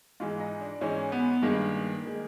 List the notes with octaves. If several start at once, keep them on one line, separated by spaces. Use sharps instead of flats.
G#2 E3 G#3 F4
D#4
D4
G#2 E3 G#3 C#4
B3
G2 D#3 G#3 A#3
D#3 G#3